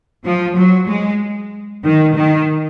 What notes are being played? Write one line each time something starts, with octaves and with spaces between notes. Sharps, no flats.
F3
F#3
G#3
D#3
D#3